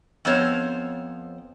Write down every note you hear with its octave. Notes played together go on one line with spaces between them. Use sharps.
F2 B3 C5 C#5